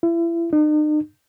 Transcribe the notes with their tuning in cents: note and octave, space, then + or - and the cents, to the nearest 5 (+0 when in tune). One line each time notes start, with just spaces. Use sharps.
E4 +35
D#4 -45